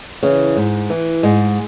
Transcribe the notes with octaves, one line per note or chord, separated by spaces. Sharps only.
C#3 E3
G#2
E3
G#2 G#3